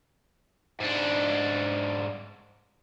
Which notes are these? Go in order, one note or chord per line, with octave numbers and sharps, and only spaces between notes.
G#2 D4